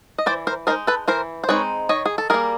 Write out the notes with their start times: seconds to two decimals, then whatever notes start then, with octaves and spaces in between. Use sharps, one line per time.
0.18 D#5
0.26 E3 C5 D5
0.47 A#4 C5
0.67 G#3 C4 D#4 A#4 C5
0.87 A4 B4
1.08 E3 A#4 C5
1.44 C5
1.49 G#3 C4 D#4 B4 C#5
1.89 D#3 C#5 D#5
2.06 G#4
2.18 A4
2.30 G3 A#3 G#4 A#4